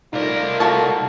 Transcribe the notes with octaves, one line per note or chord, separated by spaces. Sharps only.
C2 A3 D#4 F4 A4 A#4 D5
A#3 F#4 A5